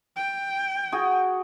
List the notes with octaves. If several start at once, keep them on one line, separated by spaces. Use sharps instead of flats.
G5
F#4 G#4